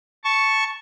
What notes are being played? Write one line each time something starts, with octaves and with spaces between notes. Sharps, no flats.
A5 C#6